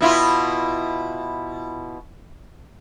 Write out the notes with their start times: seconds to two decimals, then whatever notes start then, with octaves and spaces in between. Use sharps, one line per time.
0.01 B2 E4 F4